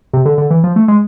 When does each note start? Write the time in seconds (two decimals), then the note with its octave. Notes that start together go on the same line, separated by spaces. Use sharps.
0.13 C3
0.25 D3
0.38 D3
0.50 E3
0.64 F3
0.76 A3
0.88 G#3